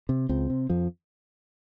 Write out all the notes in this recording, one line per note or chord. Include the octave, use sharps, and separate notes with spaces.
C3
C#2 C4
C3
F2 F3